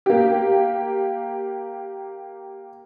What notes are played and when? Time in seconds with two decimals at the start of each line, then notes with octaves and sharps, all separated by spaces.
0.06 A#3 G4